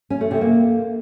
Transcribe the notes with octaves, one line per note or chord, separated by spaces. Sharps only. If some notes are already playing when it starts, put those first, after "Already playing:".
C#4
A3
C3
A#3